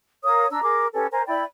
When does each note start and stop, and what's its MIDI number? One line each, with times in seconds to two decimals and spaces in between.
0.24 0.46 70
0.24 0.46 73
0.24 0.46 77
0.24 0.46 87
0.50 0.61 62
0.50 0.61 82
0.50 0.61 88
0.62 0.87 68
0.62 0.87 70
0.62 0.87 86
0.93 1.06 61
0.93 1.06 67
0.93 1.06 69
0.93 1.06 71
1.11 1.22 70
1.11 1.22 72
1.11 1.22 80
1.11 1.22 82
1.27 1.43 64
1.27 1.43 74
1.27 1.43 79
1.27 1.43 83